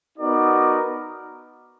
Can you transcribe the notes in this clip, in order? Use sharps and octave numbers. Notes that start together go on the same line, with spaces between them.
B3 D#4 F#4 A#4 D5